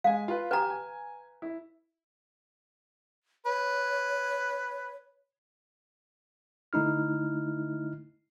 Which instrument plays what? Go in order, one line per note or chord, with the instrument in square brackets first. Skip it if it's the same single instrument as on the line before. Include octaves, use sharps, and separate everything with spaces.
[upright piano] G#3 G#5 [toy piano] F5
[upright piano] F4 B4
[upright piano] G4 G5 G#5 [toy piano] B4 A#5
[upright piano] G#5
E4
[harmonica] B4 [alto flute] C#5
[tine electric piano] D3 A3 D#4 E4 F6